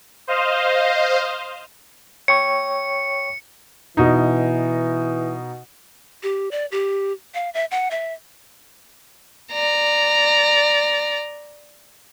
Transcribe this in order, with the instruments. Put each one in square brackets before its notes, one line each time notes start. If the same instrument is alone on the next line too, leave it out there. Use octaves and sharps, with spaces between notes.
[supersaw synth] C5 D#5 F5
[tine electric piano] C#5 G5 C#6 [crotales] C#7
[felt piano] B2 D#4 [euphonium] E3
[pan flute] G4
D5
G4
F5
E5
F#5
E5
[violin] D5 A#5